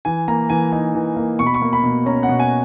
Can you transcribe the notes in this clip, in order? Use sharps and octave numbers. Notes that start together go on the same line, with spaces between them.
E3 G#5
A#3 A#5
E3 G#5
D#4 G#5
E3
A#3
B2 C#6
B5
C#6
A#3
B5
B2
C#4 A#5
F#5
B2
G#5